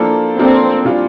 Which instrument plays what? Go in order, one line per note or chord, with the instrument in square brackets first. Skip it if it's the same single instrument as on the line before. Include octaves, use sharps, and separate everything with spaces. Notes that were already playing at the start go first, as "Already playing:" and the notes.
Already playing: [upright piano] F3 A#3 D4 F4 A4
[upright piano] F3 A#3 D4 F4 A4 [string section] C4
[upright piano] A#2 G3 D4 F4